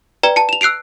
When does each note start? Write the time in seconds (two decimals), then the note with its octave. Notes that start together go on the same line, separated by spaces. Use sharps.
0.23 B4 D5 G5 A#5
0.36 A5 C#7
0.49 E7 F7
0.61 E6 F#6 C7 D7 F7